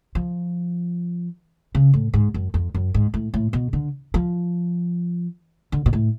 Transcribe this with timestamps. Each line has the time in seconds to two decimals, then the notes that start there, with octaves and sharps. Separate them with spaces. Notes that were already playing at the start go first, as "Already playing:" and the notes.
0.15 F3
1.75 C#3
1.94 A2
2.14 G#2
2.34 F#2
2.54 F2
2.75 F#2
2.94 G#2
3.14 A2
3.34 A2
3.53 B2
3.73 D3
4.14 F3
5.72 D3
5.86 B2
5.93 A2